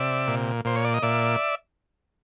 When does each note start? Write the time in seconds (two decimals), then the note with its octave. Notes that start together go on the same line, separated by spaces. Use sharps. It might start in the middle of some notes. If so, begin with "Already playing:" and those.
Already playing: C3 D5 E5
0.27 A#2
0.65 A#2 C5
0.76 C#5
0.85 D5
0.94 D#5
1.02 A#2 D5 E5